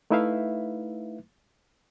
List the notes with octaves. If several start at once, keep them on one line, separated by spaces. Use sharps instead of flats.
A3 D#4 E4 B4 E5 F5